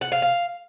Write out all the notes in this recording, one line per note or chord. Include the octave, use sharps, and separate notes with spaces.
F#5
F5
F5